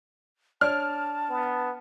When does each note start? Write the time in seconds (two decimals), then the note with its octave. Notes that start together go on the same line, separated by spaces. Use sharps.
0.61 D4 C#5 D5 A5 F6
1.30 B3